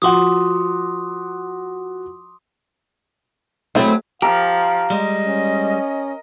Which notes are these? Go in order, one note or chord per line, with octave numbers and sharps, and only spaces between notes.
F3 F#4 F#5 C6 D6 D#6
F#3 A3 C4 E4 G#4
F3 G4 A#4 F5
G3 G#3 D#5
C#4